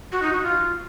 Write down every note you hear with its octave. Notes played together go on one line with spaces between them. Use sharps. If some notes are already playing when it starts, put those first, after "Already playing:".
F#4
D#4
F#4
F4